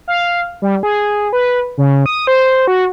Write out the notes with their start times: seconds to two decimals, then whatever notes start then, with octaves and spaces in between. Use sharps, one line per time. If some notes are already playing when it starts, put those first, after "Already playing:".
0.08 F5
0.62 G3
0.83 G#4
1.33 B4
1.78 C#3
2.06 D#6
2.27 C5
2.68 F#4